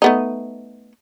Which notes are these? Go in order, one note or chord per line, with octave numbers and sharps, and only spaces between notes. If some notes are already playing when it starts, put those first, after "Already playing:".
A3 B3 D#4